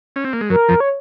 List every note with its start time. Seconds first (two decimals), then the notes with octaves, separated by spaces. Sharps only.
0.16 C#4
0.25 C4
0.33 A#3
0.41 G#3
0.50 F#2 F#3 A#4
0.69 F2 F3
0.80 C#5